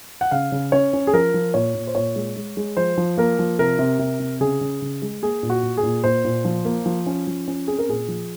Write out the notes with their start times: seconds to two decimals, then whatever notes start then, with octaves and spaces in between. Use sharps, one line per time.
0.21 F#5
0.31 C#3 F5
0.52 C#3
0.72 C#4 C#5
0.93 C#4
1.07 G#4
1.13 F3 A#4
1.34 F3
1.54 A#2 C#5
1.75 A#2
1.87 C5
1.95 A#2 C#5
2.16 G#3
2.36 G#3
2.57 G#3
2.77 F3 C5
2.97 F3
3.17 A#3 A#4
3.39 F3
3.59 C3 A#4
3.79 C3
3.99 C3
4.20 C3
4.40 C#3 G#4
4.61 C#3
4.82 C#3
5.02 G#3
5.22 A#3 G#4
5.43 A#2
5.50 F#4
5.63 A#2
5.77 G#4
5.83 A#2
6.04 A#2 C5
6.25 A#2
6.45 F3
6.65 A#3
6.86 F3
7.07 C#4
7.27 F3
7.48 C#4
7.67 C4 G#4
7.79 A#4
7.89 A#2 G#4
8.08 F3